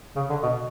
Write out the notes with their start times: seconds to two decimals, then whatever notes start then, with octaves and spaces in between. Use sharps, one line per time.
0.16 C#3
0.30 D3
0.43 B2